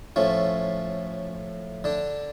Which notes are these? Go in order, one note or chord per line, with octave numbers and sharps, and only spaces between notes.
A2 F3 A3 C#4
D3 D4